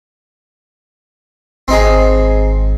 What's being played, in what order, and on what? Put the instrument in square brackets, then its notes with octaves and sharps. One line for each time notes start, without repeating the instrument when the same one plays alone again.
[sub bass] G#1 [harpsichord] C4 D#4 G#4